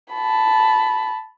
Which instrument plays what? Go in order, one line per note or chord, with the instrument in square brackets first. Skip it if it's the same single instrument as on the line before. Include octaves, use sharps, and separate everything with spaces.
[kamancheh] A5 B5